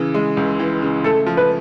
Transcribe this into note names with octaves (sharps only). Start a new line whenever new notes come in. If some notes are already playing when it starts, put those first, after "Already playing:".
Already playing: C#3 E3
G#3
C#2
E3
C#3
A3 A4
F3
B4